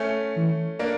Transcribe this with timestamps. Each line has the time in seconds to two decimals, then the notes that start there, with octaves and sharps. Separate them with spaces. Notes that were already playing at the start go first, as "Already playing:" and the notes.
Already playing: A3 C#4
0.37 E3
0.79 A#3 D4